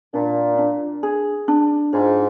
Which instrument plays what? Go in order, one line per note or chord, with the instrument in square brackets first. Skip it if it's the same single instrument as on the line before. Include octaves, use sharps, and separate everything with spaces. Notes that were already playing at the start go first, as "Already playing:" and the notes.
[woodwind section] A#2 [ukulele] D4
[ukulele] D4
G#4
D4
[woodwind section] G#2 [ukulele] F4